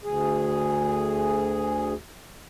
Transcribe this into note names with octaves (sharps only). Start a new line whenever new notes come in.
D2 G#4